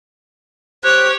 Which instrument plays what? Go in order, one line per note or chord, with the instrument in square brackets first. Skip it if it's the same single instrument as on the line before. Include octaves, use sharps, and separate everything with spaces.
[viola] G4 C#5 [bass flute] C5 [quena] F#6